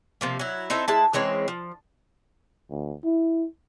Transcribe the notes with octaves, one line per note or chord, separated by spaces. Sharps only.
C3 F3 A#3
F#3 E4
C4 D#4 E4 A4
G#3 E4 A5
E3 G#3 C4 C#4
F3
D2
E4